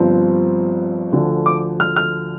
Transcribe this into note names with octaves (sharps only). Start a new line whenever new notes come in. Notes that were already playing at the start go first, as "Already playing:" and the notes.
Already playing: G1 G2 F3 C4
D2 D3 F3
D6
F6
F6